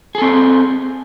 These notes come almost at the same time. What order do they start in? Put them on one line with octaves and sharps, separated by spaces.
G#4 A4 C4